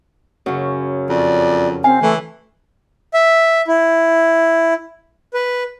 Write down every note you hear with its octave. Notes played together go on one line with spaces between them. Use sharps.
F#2 C#3
F2 D5
C4 F5 G#5
E3 A3
E5
E4
B4